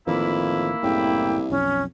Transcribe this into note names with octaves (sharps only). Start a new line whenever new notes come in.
A1 F2 D#3 E3 A#3 E4
F#1 C2 A2 C#3 G5
B1 F2 C#4